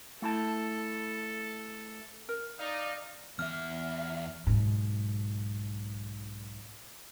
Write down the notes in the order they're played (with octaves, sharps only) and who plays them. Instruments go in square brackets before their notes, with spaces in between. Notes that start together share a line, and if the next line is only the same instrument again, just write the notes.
[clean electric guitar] A3 E4 A5 [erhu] A4
[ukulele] A#4
[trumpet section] D#4 [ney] D5 [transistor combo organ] F5
[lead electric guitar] E2 E5 [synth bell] F6
[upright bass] B1 G#2